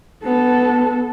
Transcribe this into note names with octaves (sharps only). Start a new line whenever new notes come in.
B3 A4